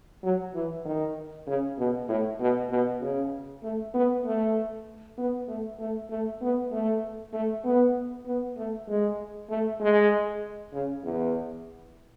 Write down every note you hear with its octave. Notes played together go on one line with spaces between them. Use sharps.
F#3
E3
D#3
C#3
B2
A2
B2
B2
C#3
A3
B3
A3
B3
A3
A3
A3
B3
A3
A3
B3
B3
A3
G#3
A3
G#3
C#3
E2